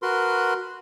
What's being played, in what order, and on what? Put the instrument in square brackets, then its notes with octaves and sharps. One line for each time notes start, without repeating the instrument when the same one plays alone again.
[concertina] F#4 A#4 B4 C6